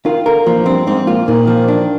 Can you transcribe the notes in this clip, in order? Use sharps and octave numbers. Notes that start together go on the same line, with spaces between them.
D#3 F4
D3 A#4
A#2 F3
G2 C4
G#2 C4
A#2 F4
A#2 D#3
F3
D4